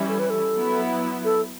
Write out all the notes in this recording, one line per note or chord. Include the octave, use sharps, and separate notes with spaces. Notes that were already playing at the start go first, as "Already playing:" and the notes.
Already playing: E3 G3 C#4 E4
A4
B4
A4
F#3 B3 E4
A4